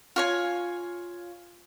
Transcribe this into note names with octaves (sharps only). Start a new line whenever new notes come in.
F4 C#5 G#5